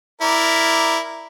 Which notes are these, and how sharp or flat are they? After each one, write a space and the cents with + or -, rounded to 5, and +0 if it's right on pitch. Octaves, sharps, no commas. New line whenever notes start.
E4 +0 A#4 +0 D5 +0